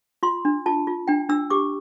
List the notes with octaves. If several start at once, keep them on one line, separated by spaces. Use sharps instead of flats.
F4 C6
D4
F4 A5
F4
D4 G5
D4 E6
G4 D6